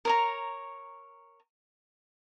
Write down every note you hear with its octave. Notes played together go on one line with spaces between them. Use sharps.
A#4 C#5 A#5